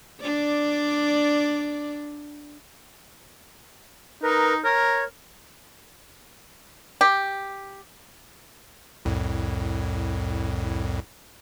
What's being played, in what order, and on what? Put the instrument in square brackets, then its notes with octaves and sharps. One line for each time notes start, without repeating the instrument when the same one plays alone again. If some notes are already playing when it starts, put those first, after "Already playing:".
[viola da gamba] D4 D5
[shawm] D#4 [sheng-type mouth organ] A#4 B4
[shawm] A#4 [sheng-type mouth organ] C#5
[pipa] G4
[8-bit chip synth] C2 F2 A2